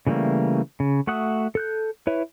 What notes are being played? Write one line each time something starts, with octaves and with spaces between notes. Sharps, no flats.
C#3 E3 G3 A3 A#3
C#3
A3 F#4 E5 F#5 D#6
A4 F#6 G6
E4 B4 C#5 E5